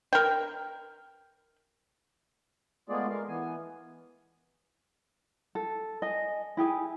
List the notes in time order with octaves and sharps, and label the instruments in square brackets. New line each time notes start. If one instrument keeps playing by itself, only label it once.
[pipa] A#4 G5
[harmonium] G#3 A3 B3 F4 G#4 D5
G#3 A#4 F5
E3 B3 G#5
[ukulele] A4
D#5 G#5
E4 G4 G#4 G#5